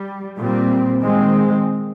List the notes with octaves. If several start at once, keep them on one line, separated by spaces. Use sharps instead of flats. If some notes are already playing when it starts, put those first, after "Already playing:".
Already playing: G3
A#2 G3 C4
D#3 G#3 C4